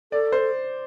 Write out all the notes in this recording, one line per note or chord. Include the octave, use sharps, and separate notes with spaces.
A4 D5
C5